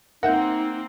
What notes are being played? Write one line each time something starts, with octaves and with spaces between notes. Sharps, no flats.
A#3 C4 D#4 A#4 E5 F#5 G6